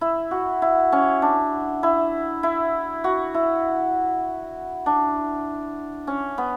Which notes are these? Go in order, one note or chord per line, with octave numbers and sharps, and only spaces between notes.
E4
F#4
E4
C#4
D4
E4
E4
F#4
E4
D4
C#4
B3